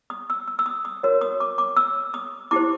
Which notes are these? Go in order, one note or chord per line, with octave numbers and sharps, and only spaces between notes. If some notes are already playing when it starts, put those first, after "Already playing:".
D#6
E6
E6
E6
D#6
D#6
F#4 A#4 C#5
D#6
D6
D6
E6
D#6
E4 G4 C5 D6